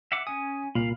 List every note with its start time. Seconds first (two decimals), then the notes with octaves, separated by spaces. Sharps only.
0.12 E5 F#5 D6
0.27 C#4 G#5 D#6
0.75 C2 A#2 F5 B5